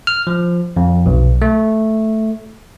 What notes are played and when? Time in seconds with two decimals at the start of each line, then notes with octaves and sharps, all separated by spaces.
0.07 F6
0.27 F3
0.77 F2
1.06 B1
1.42 A3